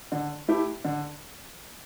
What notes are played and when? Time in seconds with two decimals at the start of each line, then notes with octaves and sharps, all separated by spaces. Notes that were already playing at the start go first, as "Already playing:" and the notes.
0.12 D3
0.48 A3 E4 G4
0.85 D3